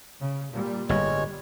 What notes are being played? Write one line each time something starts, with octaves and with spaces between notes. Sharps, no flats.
C#3
A#2 G3
G1 A2 G3 G#3 C#5